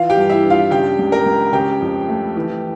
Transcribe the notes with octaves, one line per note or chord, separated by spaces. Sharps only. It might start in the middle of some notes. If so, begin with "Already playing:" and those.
Already playing: E3 F4 F5
G4 G5
G2
E4 E5
D4
F4 F5
C#3 G4 G5
C#2
A#4 A#5
C#2
C#3 G4 G5
F2
A3
E3